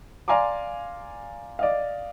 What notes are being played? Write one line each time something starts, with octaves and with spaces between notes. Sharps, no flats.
D5 F5 G#5 A#5 C6 D6
D5 D#5 F5